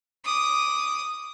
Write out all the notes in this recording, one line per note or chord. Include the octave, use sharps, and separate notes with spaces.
D6 D#6